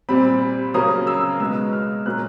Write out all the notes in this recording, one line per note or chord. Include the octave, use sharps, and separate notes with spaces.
A#2 G3 C4 B5
C#3 F#3 A#3 C#4 D#6
E6
B2 G#3 B3 E6
F6
A#2 F#3 A#3 C#4 F#6